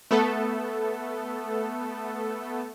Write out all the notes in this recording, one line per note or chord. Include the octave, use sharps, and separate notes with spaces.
A3 B3 A4